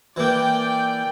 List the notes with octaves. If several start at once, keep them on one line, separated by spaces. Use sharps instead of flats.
E3 A#3 D5 G5